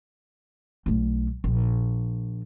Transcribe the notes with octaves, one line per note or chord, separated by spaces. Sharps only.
B1 A3
A#1